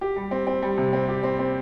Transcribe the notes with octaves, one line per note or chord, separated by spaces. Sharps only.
G4
G3
C4
C4
G3
C3
C4
G4
C4
C4